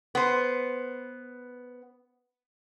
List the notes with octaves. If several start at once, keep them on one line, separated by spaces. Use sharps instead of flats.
B3 C5